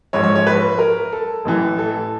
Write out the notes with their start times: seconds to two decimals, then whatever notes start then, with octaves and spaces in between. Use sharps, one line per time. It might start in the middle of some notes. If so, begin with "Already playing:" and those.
0.13 A#1 G#2 F3 C#5
0.23 C#5
0.35 C#5
0.47 B4
0.79 A#4
1.12 A4
1.45 A1 A2 E3
1.79 A4